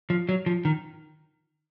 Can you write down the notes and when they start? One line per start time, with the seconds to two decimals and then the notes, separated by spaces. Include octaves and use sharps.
0.10 F3
0.29 F#3
0.46 F3
0.65 D#3